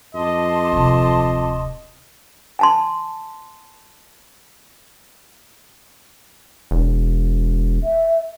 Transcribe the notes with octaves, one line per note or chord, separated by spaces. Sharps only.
F2 D#5 A5 C6 D6
D1 C3
G#5 A5 C6
E1
E5